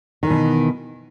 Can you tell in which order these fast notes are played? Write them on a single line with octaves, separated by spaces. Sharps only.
D#3 E3 B2